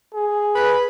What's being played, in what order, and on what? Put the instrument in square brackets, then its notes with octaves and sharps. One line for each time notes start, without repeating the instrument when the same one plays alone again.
[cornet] G#4
[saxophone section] B4